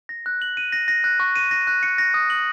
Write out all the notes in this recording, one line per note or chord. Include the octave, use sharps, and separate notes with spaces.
A#6
F#6
F#7
D#7
A#6
A#6
F#6
C#6
D#7
A#6
F#6
C#7
A#6
D#6
F#7